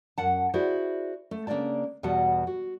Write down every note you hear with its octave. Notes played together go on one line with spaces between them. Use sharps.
F#2 F#5 A5
E4 F#4 G#4 C5 D5
A3
C#3 A#3 C4 D4 D5 A5
E2 B2 G3 F#4 F#5 A5
F#4